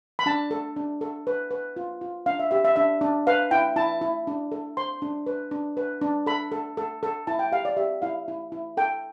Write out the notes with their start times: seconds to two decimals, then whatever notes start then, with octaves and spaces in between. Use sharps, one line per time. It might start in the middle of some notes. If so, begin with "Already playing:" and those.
0.19 B5
0.26 D4 A5
0.51 A4
0.76 D4
1.01 A4
1.27 B4
1.51 B4
1.76 F4
2.01 F4
2.26 D4 F5
2.39 E5
2.51 G4 E5
2.65 E5
2.76 D4 E5
3.01 D4
3.27 B4 F5
3.51 E4 G5
3.76 E4 A5
4.01 E4
4.27 D4
4.52 A4
4.77 C5 C6
5.02 D4
5.26 B4
5.51 D4
5.77 B4
6.01 D4
6.26 A4 B5
6.52 A4
6.77 A4
7.03 A4
7.27 E4 A5
7.39 G5
7.52 G4 F5
7.65 D5
7.77 G4 E5
8.02 E4 F5
8.28 E4
8.52 E4
8.77 A4 G5